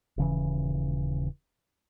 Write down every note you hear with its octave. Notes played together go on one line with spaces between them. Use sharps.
D#1 C#3 E3